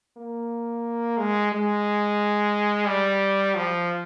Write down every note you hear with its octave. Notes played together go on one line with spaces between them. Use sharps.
A#3
G#3
G#3
G3
F3